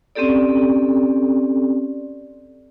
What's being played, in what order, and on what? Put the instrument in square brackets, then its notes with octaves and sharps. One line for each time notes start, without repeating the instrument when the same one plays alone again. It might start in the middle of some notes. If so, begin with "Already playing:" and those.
[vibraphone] C4 C#4 G4 A4 D5